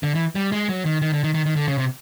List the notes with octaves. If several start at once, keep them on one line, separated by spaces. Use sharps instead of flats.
D3
E3
G3
G#3
F#3
D#3
D#3
D3
D#3
D#3
D#3
D3
C#3
C3